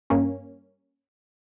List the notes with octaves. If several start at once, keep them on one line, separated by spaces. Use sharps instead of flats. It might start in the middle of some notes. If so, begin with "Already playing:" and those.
G2 A#3 C#4